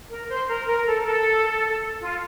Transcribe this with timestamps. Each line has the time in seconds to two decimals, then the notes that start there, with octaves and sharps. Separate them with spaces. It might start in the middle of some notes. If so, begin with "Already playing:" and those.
0.10 A#4
0.29 C5
0.48 A#4
0.67 A#4
0.86 A4
1.01 A#4
1.05 A4
2.01 F4